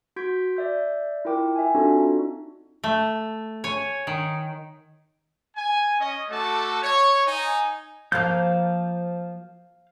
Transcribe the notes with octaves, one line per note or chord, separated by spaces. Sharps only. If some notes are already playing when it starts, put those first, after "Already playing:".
F#4 C6 G6 G#6 B6 D7
D5 E5 G6
E4 F4 A#4 G5 D6
E5 G#5
C4 D4 D#4 F4 F#4 A4
A3
C#5 G#5
D#3
G#5
C#4 D#5
A3 F#4 A4 A5 D6
C#5
D#4 G#5
F3 A#3 F5 G6